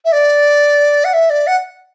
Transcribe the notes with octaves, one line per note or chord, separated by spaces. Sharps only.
E5
D5
F#5
E5
D5
F#5